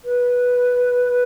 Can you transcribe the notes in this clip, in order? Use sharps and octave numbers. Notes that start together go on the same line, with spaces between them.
B4